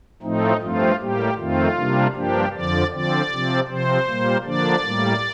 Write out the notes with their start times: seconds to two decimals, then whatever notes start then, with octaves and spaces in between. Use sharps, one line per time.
0.22 A2 F3 A3 C4 D#4
0.61 G2 F3 A3 C4 F4
0.99 A2 G3 A#3 G4
1.37 F2 D#3 A3 C4 F4
1.76 C3 G3 A#3 D4
2.14 G2 F3 A#3 D4 G4
2.53 F2 D3 F3 D5
2.91 D3 F3 C4 D5
3.30 C3 F3 C4
3.68 C3 F3 C4 C5
4.07 A#2 G3 A#3
4.44 D3 F3 A#3 D4 D5
4.83 A2 G3 A#3